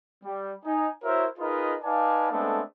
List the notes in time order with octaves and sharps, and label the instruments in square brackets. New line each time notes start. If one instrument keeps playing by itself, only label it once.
[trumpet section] G3
D#4 G#5
E4 F#4 A#4 C5 C#5 E5
D#4 F4 G#4 A#4 B4 D#5
D#4 B4 D5 F5 G#5 A5
G#3 A3 B3 C4 D4 A4